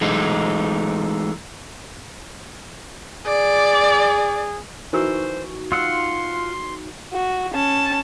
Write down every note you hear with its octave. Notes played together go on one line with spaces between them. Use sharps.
E3 G#3 A3 D#4
G#4 D5
E3 D#4 F#4 A#4 C5 C#6 E6
F4 F#5 C6 E6
F#4
C#4 A5